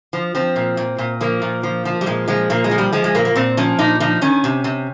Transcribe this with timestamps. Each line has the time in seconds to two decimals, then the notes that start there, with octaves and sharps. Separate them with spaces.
0.13 F3
0.35 F3 C4
0.56 A#2
0.77 A#2
0.98 A#2
1.21 F3 A#3
1.42 A#2
1.63 F3
1.85 F3
2.01 G3
2.06 A#2 G#3
2.28 F3 G#3
2.50 A#2 A#3
2.64 G#3
2.71 F3
2.78 G3
2.93 F3 G#3
3.04 G#3
3.15 A#2 A#3
3.25 A#3
3.35 A#2 C4
3.57 F3 C#4
3.79 A#2 D#4
4.00 F3 D#4
4.21 D#3 C#4
4.44 C3
4.64 C3